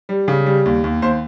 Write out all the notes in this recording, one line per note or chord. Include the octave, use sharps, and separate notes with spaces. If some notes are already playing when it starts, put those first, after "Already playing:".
G3
C#3
G3
D#2
D#2
D#2 C5